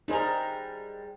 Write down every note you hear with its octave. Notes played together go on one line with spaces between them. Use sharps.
G3 G#3 D#4 G#4 A#4 C5